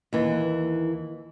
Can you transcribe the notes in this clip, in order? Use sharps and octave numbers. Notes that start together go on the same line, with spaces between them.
D#2 E3